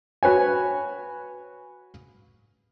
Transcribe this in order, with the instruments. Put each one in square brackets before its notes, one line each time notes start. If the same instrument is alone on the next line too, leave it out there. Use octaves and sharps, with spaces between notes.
[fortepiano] F#4 B4 C#5 G#5